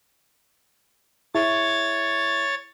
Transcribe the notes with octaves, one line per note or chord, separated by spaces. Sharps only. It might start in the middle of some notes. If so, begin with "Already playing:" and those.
E4 G#4 C#5 E5 A6